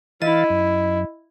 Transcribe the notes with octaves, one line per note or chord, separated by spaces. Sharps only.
E3 E4 D#5 F5 A6
F#2